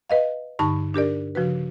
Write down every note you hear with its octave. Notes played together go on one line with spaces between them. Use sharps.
B4 D#5 F5
G2 D3 D#4 A5 B5 C#6
D4 G4 A#4 D5
C#3 F3 F#4 B4